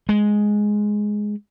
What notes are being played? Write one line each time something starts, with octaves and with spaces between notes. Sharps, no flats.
G#3